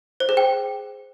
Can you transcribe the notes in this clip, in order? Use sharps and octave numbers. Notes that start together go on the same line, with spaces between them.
C5
G#4
G5